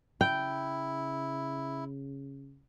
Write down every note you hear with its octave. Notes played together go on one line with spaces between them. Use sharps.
C#3 E4 G5